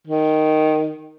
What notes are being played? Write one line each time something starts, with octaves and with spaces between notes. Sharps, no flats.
D#3